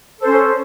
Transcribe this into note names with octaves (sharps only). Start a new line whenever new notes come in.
C#4 A4 C5